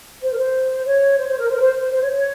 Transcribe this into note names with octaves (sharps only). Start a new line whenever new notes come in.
C5
A#4
C5
C#5
C5
C5
A#4
C5
A#4
C5
C5
C5
C#5
C#5